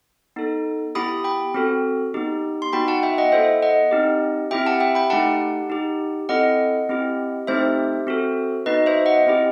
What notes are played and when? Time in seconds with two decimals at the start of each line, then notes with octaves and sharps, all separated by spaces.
0.36 B3 D#4 A4
0.95 B3 E4 G4 B5 D#6
1.24 G5 B5
1.54 C4 F#4 A4
2.14 B3 D#4 G4
2.62 C6
2.73 B3 D#4 F#4 G5 B5
2.88 F#5 A5
3.03 E5 G5
3.18 D#5 F#5
3.32 B3 E4 A4 C5 E5
3.62 D#5 F#5
3.91 C4 D#4 G4
4.51 C4 E4 G4 E5 G5
4.66 F#5 A5
4.80 E5 G5
4.95 G5 B5
5.10 A3 D#4 G4 F#5 A5
5.70 D#4 G4
6.29 C4 E4 A4 D#5 F#5
6.89 C4 E4 G4
7.47 A3 C4 D#4 G4 C5 E5
8.07 C4 F#4 A4
8.66 B3 D#4 F#4 B4 D#5
8.86 C5 E5
9.06 D#5 F#5
9.27 C4 E4 G4